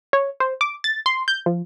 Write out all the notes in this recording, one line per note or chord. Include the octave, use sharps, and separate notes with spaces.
C#5
C5
D6
A6
C6
G6
F3